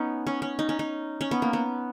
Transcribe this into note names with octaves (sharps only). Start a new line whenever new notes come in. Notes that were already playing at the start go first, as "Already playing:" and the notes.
Already playing: B3 C#4 D#4
C#4
C#4
D#4
C#4
D#4
C#4
B3
A#3
B3